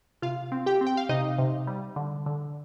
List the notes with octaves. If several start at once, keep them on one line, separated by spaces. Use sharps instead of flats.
C3 F4 F5
C4
G4 G5
C4
G5
F5
C3 D#4 D#5
C3
G3
D3
D3